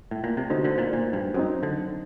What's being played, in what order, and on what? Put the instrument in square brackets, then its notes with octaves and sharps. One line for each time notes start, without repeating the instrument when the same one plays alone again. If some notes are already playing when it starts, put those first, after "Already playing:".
[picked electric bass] A2
A#2
C3
[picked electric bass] D3 [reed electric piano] A3 D#4 F#4 C5
[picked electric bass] D3
A#2
A#2
G2
[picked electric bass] F#2 [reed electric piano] F#3 C4 D#4
[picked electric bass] D3